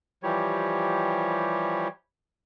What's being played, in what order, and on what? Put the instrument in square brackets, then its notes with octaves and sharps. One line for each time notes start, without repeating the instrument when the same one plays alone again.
[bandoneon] E3 F3 G3 G4 C#5